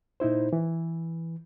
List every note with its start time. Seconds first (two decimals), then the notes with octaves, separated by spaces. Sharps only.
0.20 A#2 D#4 E4 C5
0.53 E3